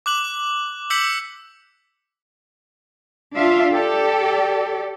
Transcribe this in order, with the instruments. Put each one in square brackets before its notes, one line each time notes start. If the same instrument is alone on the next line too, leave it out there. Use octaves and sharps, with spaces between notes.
[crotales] D6 F#6 F#7
D6 E6 G6 B6 C#7 F#7
[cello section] D4 F4 E5 F5
G4 A4 D5